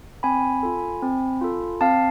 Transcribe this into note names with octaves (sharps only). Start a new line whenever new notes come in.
C4 G#5 B5
F4 A4
C4
F4 A4
C4 F5 A5